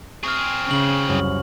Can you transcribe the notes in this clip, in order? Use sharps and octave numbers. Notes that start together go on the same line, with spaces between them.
C4 G#4 C#6 F6
C#3 C#6 A#6 F#7
C2 F#2